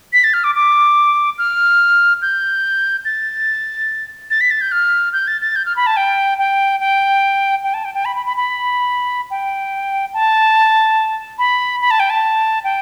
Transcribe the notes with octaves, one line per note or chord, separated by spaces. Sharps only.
B6
A6
F6
D6
D6
F6
G6
A6
A6
B6
A6
G6
F6
G6
A6
A6
G6
F6
B5
A5
G5
G5
G5
G5
A5
G5
G5
B5
B5
B5
B5
G5
A5
B5
B5
A5
G5
A5
G5